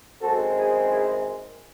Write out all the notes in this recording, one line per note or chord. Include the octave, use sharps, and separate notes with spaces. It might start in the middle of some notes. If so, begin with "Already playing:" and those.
F#2 D#3 G#3 C4 F#4 A4
E4 G#4
E4 G#4